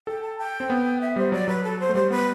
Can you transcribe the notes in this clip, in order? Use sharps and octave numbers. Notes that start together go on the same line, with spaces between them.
A4 G5
A5
G5
C4
B3
E5
G3 C5
F#3 D5
F#3 B4
A4
C5
A3
G3 C5
B3 B4